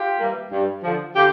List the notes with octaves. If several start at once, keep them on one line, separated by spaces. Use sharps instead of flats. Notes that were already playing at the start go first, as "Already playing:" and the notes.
Already playing: F4 G4
E3 G3 A#3
G2
D3 F3
D3 F4 G4